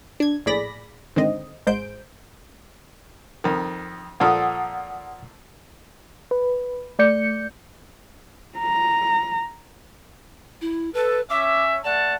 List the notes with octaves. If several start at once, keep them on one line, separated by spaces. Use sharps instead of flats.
D4 G#6
A#1 A2 G#4 D5 B5 A#6
G#2 D3 D#3 C4 D#5
G#1 G#2 G#3 C5 G6 D7
F2 D#3
A#2 F3 A4 F#5 D#6
B4
A3 D5 G6 C#7
A#5
E4
A4 B4
C#4 E5 D6
A3 D5 F#5 A5